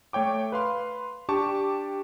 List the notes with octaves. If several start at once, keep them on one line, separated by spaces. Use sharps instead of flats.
A3 C#5 G5 D6
B4 F5 C6
D4 G4 A5 C#6 D6